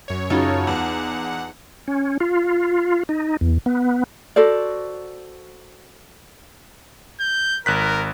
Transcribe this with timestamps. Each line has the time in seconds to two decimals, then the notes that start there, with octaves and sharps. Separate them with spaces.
0.08 F#2 C#5
0.30 C#3 F#3 D#4 F4 A4
0.67 E2 F#5
1.88 C#4
2.20 F4
3.09 D#4
3.41 E2
3.66 B3
4.36 F#4 A4 C5 D5
7.20 G6
7.66 G#1 A#4 F#6 B6